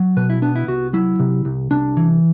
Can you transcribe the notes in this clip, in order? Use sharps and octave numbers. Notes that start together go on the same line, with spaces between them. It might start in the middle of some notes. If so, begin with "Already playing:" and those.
Already playing: F#3
B2 B4
E4
B3 D4
E4
C2 F#4
F#3 E4
C3
C2
C2 D4
E3